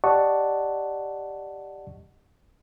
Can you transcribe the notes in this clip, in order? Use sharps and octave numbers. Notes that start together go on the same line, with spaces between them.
G4 D5 D#5 F#5 A5 C#6